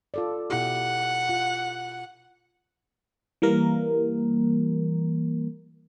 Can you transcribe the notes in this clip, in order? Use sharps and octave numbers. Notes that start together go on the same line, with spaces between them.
F4 A4 D5
B2 E4 G4 F#5
F4
E3 G3 A#3 A#4